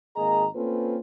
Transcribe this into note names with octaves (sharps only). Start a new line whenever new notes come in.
G#1 A#3 G#4 D#5 A#5
A#3 C4 C#4 F4 A4 B4